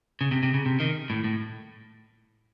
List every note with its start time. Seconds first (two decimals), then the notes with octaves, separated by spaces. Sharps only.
0.21 C#3
0.31 C3
0.43 C3
0.54 C#3
0.66 C3
0.80 D#3
1.10 A2
1.24 A2